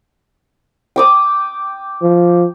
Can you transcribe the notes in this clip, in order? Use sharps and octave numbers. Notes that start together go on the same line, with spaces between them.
G5 D6 D#6
F3